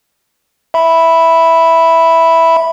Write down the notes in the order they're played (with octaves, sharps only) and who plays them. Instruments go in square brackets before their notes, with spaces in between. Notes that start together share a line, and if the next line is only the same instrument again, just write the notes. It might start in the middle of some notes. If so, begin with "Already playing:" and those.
[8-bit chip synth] E5 B5